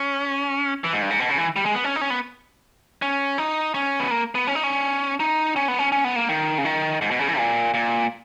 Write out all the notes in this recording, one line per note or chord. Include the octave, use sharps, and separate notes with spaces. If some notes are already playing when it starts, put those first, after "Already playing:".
Already playing: C#4
E3
G#2
G2
G#2
B2
C#3
E3
G3
G#3
B3
C#4
D#4
C#4
B3
C#4
D#4
C#4
B3
A#3
B3
C#4
D#4
C#4
D#4
C#4
B3
C#4
C#4
B3
A#3
D#3
C#3
D#3
G#2
B2
C#3
E3
A#2
A#2